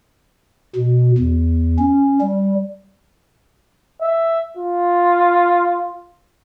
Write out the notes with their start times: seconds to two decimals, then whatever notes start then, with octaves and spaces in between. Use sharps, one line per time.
0.76 B2
1.18 E2
1.79 C#4
2.21 G3
4.01 E5
4.57 F4